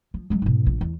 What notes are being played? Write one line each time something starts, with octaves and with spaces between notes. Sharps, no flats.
F3
F#3 G#3
G#2 B2
A#1 F3
E2